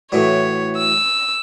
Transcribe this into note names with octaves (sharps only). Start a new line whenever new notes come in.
A2 E3 F#3 C#5
E6